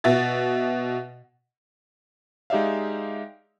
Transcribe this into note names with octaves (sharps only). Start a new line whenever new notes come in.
B2 E5 A6
G#3 D#4 G4 D5 E5 F5